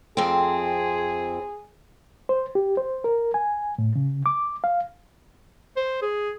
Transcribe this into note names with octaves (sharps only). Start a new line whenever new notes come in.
F2 C4 G#4
C5
G4
C5
A#4
G#5
A2
C#3
D6
F5
C5
G#4